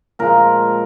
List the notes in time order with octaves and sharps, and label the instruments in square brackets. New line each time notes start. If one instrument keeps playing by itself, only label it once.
[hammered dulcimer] A#2 F3 G#3 A#4